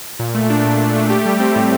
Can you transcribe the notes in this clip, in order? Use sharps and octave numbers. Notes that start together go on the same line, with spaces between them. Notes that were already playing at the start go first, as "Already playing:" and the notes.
A#2
A3
D4
A#2
A#2
A3
G4
G3
C4
A2